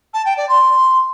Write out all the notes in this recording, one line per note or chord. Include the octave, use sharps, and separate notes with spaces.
A5
G5
D5
C6